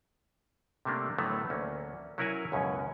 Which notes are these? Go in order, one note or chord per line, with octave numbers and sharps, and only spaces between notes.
C3 G3 A3 A#3 D4
A2 D3 F#3 A3 B3
D2 A#3 C#4
F#3 C#4 E4 A#4 F#5 G#5
C#2 F#2 B2 C#4